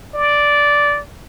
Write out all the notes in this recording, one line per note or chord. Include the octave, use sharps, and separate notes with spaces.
D5